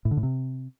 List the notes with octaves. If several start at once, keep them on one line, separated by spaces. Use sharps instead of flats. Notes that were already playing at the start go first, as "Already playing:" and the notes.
A2
D3
A2
C3